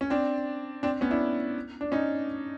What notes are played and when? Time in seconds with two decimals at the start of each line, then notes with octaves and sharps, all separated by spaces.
0.01 C#4
0.10 C4 D4
0.83 C4 D4
1.01 B3 C#4
1.11 D4 E4
1.81 D4
1.92 C#4 D#4